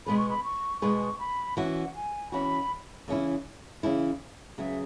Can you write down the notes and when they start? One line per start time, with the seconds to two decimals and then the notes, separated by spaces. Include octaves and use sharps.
0.06 B2 G#3 B3 G#4 B4 B5
0.18 C#6
0.30 B5
0.44 C#6
0.82 B2 G#3 B3 G#4 B4 C#6
1.19 B5
1.57 E3 C#4 F#4 F#5
1.95 G#5
2.32 E3 C#4 F#4 B5
3.08 C#3 E3 C#4 E4
3.83 C#3 E3 C#4 E4
4.58 C#3 F#3 B3 G#4 E5